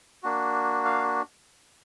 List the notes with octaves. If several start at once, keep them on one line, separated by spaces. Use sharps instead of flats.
A#3 D4 F#4
F5